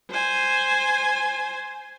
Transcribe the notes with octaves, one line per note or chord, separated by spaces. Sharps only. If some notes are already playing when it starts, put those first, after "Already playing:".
C5 G#5